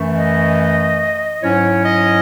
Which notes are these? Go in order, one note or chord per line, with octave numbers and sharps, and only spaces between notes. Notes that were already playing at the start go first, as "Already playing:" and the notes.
Already playing: F#2 E3 A3
D#5
G#2 F#3 C#4 E4 C#5
D#5